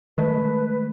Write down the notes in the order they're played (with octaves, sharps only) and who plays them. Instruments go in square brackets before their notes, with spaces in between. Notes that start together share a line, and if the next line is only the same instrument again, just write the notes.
[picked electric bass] D#3 G#3 A3 [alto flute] B4